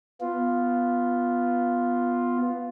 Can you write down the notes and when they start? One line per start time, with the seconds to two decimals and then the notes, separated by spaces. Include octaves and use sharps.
0.21 B3 F4